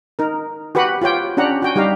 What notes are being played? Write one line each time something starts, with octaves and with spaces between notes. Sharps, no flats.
D#4 A#4
F#4 G4 B4 F#5 B5
F4 G4 C#5 G5
C#4 D4 G4 F#5 A#5
F#4 G5 G#5
G3 D#4 G4 F5 A#5